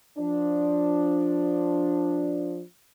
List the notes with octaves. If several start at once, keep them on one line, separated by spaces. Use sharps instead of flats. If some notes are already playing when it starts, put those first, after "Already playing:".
F3 D4